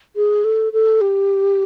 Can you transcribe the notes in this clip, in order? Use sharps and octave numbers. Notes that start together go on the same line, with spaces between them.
G#4
A4
A4
G4